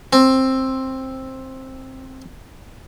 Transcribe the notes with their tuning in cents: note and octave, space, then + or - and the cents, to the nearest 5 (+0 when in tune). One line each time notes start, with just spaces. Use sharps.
C4 +10